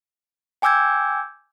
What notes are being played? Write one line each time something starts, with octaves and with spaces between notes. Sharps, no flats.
G5 G#5 D6 E6 G6 G#6